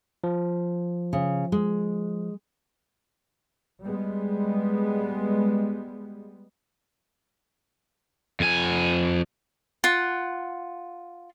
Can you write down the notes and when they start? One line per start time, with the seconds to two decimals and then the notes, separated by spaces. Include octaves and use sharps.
0.24 F3
1.13 C#3
1.52 G#3
3.82 G3 G#3 B3
8.40 F2 G#5
9.84 F4 F#5